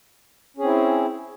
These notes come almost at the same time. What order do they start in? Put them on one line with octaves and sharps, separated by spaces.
C#4 G#4 C4 E4